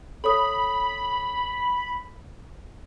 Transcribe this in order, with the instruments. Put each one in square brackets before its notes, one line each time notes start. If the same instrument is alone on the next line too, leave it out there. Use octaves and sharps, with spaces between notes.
[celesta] A4 C#5 D#6 [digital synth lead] B5